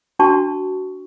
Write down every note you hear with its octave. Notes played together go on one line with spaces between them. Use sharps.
D4 F#4 A5 C#6